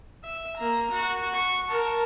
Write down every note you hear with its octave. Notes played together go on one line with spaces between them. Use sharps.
E5
A#3 A#5
F#4
C#6
A#4 A5